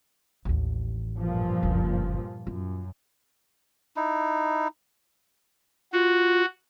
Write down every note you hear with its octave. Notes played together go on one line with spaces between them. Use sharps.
A1 D#2
G2 A#2 F3
F#1 D2
F#2 F4
D#4 E4
F4 F#4